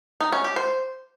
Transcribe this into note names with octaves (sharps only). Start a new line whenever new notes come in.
D#4
C#4
G4
C5